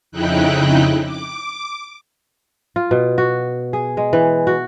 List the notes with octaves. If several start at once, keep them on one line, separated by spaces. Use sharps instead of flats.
F2 C#3 D#4 E4 G5 F#6
D6
F4
B2
F#4
G#4
G#3
E3
F#4